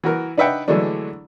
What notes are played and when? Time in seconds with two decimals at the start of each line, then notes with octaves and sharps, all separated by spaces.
0.04 E3 F#4 A#4
0.38 D4 D#4 B4 E5 F#5 G5
0.68 D3 E3 F#3 G#3 A3 D4